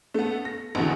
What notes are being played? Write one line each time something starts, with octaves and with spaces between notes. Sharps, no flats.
A3 B3
A#6
A#1 E2 B2 D3